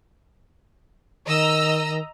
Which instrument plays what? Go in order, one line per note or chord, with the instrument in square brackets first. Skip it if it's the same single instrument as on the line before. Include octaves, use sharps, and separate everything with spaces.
[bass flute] D#3 [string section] D#5 A#5 E6